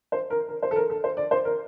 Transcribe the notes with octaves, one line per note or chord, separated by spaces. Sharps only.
C5
A#4
A#4
C5
A4
A#4
A4
C5
D5
C5
A#4